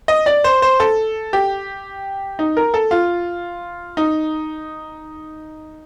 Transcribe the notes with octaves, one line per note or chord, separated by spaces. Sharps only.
D#5
D5
C5
C5
A4
G4
D#4
A#4
A4
F4
D#4